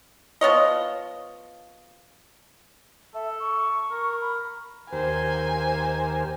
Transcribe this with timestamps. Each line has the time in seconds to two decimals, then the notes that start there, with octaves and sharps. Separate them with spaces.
0.41 F3 B3 C#5 D#5
3.15 A4 E5
3.40 C#6
3.91 A#4
4.21 B5
4.93 D#2 G4 A#4 C5 G#5